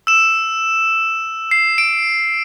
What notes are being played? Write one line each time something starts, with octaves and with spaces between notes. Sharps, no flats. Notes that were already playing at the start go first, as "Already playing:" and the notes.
E6 E7
C7
D7